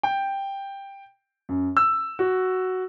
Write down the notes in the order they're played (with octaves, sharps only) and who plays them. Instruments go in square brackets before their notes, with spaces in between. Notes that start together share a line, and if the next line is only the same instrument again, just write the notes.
[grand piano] G5
F#2
E6
F#4